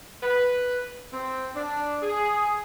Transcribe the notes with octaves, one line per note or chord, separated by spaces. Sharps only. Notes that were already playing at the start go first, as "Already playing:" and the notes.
B4
C4
D4
G#4